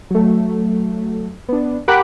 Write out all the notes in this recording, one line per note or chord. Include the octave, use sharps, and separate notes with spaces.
F#3 A3
B3 D4
G4 A#4 F#5 B5 D6 F#6